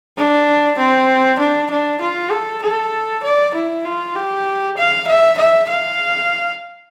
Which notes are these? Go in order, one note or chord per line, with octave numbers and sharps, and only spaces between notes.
D4
C4
D4
D4
F4
A4
A4
D5
E4
F4
G4
F5
E5
E5
F5